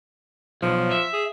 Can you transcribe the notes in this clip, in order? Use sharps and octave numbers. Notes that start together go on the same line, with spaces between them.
B1 F3
E5
G#4